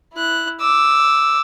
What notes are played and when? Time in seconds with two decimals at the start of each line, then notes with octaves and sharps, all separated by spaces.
0.13 E4 F#6
0.60 D6 E6